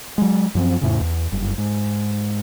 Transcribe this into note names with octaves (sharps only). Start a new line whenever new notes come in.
F#3 G#3
F#2 F3 C4
F2 A2 C#3
E2
F#1 G2
G#2